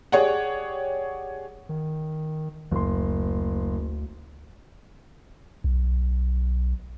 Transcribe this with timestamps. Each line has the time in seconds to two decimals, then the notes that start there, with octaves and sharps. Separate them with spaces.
0.12 G4 G#4 C#5 D5 F#5
1.69 D#3
2.71 F#1 D2 C6
5.64 B1